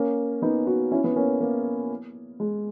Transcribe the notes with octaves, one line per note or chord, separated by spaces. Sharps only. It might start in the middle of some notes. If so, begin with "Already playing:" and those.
Already playing: A#3 C#4
B3 D#4
D#4 F#4
C#4 E4
B3
A#3 C#4
A#3
G#3